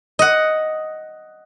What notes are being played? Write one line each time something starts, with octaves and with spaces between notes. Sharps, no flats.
D#5 F#5